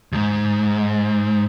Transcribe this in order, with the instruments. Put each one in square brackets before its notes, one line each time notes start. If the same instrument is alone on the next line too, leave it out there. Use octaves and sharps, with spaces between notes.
[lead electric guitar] D#2 G#2